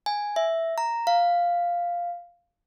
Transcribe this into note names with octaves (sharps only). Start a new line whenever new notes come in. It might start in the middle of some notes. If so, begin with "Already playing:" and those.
G#5
E5
A#5
F5